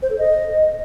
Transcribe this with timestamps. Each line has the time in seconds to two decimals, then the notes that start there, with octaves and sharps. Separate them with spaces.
0.02 C5
0.10 A4
0.18 D#5